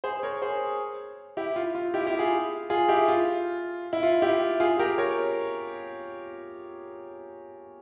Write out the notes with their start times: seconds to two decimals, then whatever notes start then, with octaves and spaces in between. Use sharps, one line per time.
0.04 G#4 C5
0.23 A#4 C#5
0.42 G#4 C5
1.37 E4 G4
1.56 F4
1.75 F4
1.94 E4 G4
2.07 E4 G4
2.19 F4 G#4
2.70 F4 G#4
2.89 E4 G4
3.08 F4
3.93 E4
4.03 F4
4.22 E4 G4
4.60 F4 G#4
4.79 G4 A#4
4.98 A#4 C#5